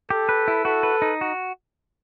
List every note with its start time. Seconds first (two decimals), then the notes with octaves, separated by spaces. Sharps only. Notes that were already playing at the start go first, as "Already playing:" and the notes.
0.10 G4 A4
0.29 B4
0.48 E4
0.65 F#4 A4
0.83 B4
1.02 D#4
1.21 F#4